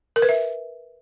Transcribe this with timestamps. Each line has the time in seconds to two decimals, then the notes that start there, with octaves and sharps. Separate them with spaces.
0.16 A#4
0.22 B4
0.29 E5